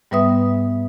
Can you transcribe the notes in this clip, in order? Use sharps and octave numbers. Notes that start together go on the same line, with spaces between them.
G#2 G3 B3 B4 E5 D#6